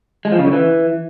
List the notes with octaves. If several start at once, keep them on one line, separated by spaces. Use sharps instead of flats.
G#3
F3
C#3
D3
E3